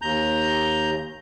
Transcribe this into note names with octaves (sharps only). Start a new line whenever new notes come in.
D#2 A#5 G6